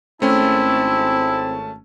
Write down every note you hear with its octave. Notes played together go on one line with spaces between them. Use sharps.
G#1 A3 C4 C#4 E4 A5